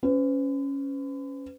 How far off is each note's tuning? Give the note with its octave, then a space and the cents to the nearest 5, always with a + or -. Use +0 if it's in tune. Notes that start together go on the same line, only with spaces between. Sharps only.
C#4 +0 B4 +45